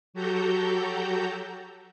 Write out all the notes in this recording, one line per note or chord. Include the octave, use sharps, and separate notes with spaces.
F#3 F#4 G4 A4 A#5 G6